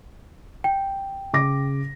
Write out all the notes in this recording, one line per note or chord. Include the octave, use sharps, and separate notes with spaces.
G5
C#3 D6 A#6